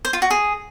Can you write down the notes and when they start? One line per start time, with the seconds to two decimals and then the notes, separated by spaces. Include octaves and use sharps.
0.05 C5
0.13 F4
0.22 F#4
0.30 G#4